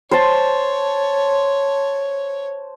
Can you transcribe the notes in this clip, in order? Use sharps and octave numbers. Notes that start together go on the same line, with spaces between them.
C5 C#5 A5